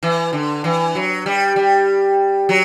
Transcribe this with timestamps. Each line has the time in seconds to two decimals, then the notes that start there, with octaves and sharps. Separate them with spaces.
0.03 E3
0.33 D3
0.64 E3
0.95 F#3
1.26 G3
1.56 G3
2.49 F#3